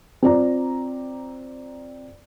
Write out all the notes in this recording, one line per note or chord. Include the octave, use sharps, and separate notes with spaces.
C4 F4 D5 A#5